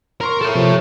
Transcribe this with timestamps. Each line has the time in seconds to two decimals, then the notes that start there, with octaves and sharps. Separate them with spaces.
0.21 A#4 A#5 C6 C#6
0.42 A4 C#5
0.55 C3 F3